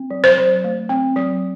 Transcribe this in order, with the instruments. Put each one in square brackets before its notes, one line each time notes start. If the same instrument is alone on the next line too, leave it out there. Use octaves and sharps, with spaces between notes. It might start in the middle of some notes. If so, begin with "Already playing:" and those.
Already playing: [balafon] C4
F#3
C5
F#3
A3
C4
F#3